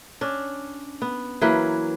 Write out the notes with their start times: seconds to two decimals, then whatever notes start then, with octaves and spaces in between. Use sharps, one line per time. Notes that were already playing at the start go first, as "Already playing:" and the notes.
0.21 C#4 D4
1.02 B3
1.41 E3 F#3 A#3 B4